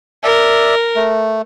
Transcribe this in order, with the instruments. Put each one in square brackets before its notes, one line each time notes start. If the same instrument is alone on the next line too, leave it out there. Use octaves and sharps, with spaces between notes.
[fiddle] A#4 [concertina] D5 E5
[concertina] A3